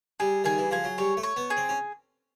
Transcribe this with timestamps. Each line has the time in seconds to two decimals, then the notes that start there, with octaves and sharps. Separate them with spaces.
0.20 G3 G#4
0.44 D#3 G#4
0.58 E3
0.71 F3 G#4
0.84 F#3
0.98 G3 C#5
1.17 A3
1.23 C#5
1.36 B3
1.50 G#4
1.57 C4
1.69 C#4